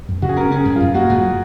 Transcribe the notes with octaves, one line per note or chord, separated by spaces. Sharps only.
F#2
C#3 F#4
G#4
C#4 A#4
C#4 G#4
F#2
F#2 F4
A#3 F#4
F#2